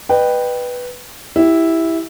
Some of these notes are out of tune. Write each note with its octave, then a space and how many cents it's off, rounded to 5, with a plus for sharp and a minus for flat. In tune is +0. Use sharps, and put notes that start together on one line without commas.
B4 +0 D#5 -40 G5 +0
E4 -5 G4 +0